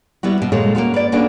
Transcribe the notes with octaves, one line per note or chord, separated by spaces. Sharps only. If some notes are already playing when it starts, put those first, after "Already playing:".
G3 B3 E4 F#4
D#2 B2
D#2 A#2 G#3 A4 C#5 F5
A#3 C#4 F#4 F5
B4 D5
A#3 C#4 D4 F#4 A4 B4